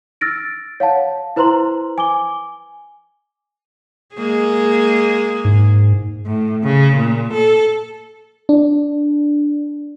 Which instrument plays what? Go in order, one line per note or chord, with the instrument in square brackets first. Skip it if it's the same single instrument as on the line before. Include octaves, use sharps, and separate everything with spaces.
[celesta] E6 F6 A6 A#6 D7
C#5 F5 F#5 A5
E4 B4 C5 A#5 C6 F#7
G#5 D6 G7
[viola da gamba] G#3 A#3 G#4
[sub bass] G#2
[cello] A2
C#3
A#2
A4
[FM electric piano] D4